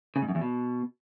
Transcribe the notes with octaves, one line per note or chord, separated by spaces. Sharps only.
C#3
G#2
F#2
E2
B2